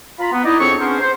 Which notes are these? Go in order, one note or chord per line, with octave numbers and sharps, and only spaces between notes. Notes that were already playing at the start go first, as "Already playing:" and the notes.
F4 A#5 B5
B3
D#4 E4 D5 D#5
F2 C4 D4 G#4 C#5 C#6
B3 C#4 D4 G#4 A#4 C5
C5